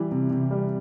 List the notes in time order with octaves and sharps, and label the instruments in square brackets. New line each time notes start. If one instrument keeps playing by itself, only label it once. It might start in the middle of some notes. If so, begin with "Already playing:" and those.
Already playing: [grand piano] E3 G3
C3
C3
G3